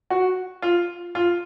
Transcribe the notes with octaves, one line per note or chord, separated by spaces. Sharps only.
F#4
F4
F4